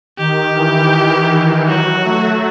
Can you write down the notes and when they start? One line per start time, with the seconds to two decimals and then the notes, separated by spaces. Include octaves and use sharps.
0.18 D#3 G4
0.56 E3
0.93 D#3
1.30 E3
1.67 F#3 F#4
2.04 A3